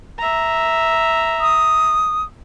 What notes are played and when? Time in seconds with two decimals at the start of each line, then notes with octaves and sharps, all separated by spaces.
0.18 E5 A#5
1.40 D#6